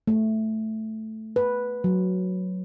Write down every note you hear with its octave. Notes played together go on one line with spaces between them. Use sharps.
A3
B4
F#3